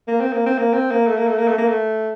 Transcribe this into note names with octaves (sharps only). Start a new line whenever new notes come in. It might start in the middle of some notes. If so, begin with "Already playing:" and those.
A#3
C4
A#3
C4
A#3
C4
A#3
A3
A#3
A3
A#3
A3
A#3
A3